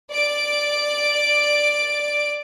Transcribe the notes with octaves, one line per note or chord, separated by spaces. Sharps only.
D5 D7